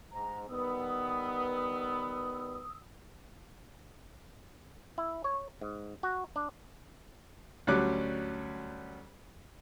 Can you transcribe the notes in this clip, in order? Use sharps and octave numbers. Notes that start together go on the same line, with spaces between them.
G#2 A#5
D#3 G3 B3 D#6 E6
E4
C#5
G#2
F#4
D4
D2 F#3 G3 C#4 D6 F#6